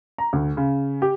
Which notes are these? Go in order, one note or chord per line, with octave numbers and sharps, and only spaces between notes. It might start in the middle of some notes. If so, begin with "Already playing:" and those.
A#5
D2
C#3
G4